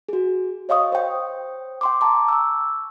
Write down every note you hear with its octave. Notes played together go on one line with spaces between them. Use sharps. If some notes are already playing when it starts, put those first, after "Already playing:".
F#4 G#4
C#5 D#5 F5 C#6 D#6
C5 G5
G5 C6 D6
G5 A5 A#5 D6
C#6 E6